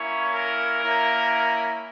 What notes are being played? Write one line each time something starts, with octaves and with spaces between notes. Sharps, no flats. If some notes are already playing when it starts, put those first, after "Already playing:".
Already playing: A#3 C#4 E4 C#5
A#4
A#3 C#4 E4